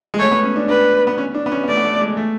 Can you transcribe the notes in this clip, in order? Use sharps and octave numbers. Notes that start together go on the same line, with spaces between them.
G#3
A3 C#5
B3
C#4
D4
D4 B4
B3
C#4
D4
B3
C#4
B3
A3 D5
B3
A3
G#3
A3